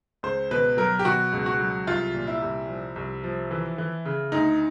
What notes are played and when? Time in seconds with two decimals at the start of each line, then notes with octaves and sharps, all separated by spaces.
0.23 C#2 C5
0.51 B2 B4
0.77 F#3 A#4
0.99 G4
1.05 B2 F#4
1.32 C#2
1.46 F#4
1.60 F#3
1.87 C2 F4
2.14 A#2
2.27 E4
2.42 C2
2.68 F3
2.96 C2
3.24 F3
3.51 E3
3.78 E3
4.05 C#3
4.32 D2 D#4